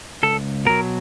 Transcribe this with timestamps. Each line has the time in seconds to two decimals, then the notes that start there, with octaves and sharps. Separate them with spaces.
0.23 C#2 A4
0.65 B2 F#3 A#4